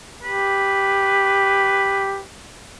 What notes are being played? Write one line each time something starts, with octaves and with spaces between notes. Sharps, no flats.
G4 B4